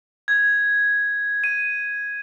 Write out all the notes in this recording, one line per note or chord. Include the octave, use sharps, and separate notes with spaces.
G#6
D#7